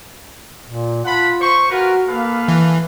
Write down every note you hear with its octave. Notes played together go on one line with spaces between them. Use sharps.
A#2
F4 F#5 A5 B5
C5 C#6
F4 F#4 A#4 B4
A#3 A4 B4 F5
E3